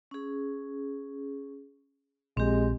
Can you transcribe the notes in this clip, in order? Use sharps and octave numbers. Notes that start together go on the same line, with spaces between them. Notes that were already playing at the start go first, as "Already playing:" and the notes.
C#4 G#4
A#1 G#3 C4 G4